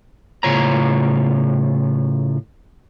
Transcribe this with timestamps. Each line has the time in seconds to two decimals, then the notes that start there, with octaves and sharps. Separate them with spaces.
0.43 A2 C#3 F4 C#5 A#5